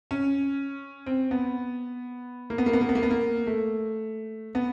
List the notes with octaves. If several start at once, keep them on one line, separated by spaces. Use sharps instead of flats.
C#4
C4
B3
A#3
B3
A#3
B3
A#3
B3
A#3
B3
A#3
A3
B3